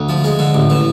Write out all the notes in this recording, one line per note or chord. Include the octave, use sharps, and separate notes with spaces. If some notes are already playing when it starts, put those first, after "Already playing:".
Already playing: D2
F3
G#3
D3
A1
E3